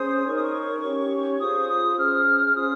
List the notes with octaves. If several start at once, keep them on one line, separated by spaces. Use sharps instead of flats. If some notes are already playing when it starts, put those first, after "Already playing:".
Already playing: C#4 G#4 C5 D#6
D#4 A#4 C#5 C#6
D#6
C#6
C#4 G4 C#5
F4 G#4 C5 D#6
C#6
D#6
D#6
C#4 G#4 C5 F6
C#4 F4 G#4 C5 D#6